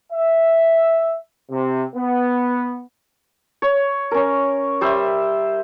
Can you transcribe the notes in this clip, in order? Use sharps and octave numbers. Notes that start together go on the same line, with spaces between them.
E5
C3
B3
C#5
C#4 A#4
G3 C5 E5